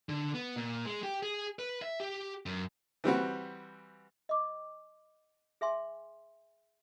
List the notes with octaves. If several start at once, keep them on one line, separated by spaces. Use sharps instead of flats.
D3
B3
A#2
G#3
G4
G#4
B4
E5
G4
F#2
E3 G3 C4 F#4
D#5 D6
G#4 E5 G#5 C6